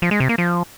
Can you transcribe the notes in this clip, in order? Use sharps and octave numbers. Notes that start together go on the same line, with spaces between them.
F3
G#3
C3
A#3
F3